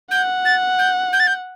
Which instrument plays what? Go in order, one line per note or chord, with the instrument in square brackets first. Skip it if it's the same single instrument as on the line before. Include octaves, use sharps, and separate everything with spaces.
[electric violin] F#5 [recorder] G6
[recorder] A6
G6
G6
A6
G6